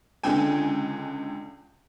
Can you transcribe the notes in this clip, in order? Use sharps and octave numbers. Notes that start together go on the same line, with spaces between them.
C#2 D3 G5 G#5